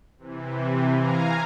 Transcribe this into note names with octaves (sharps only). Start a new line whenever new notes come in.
C3 E3
F5 G#5 A#5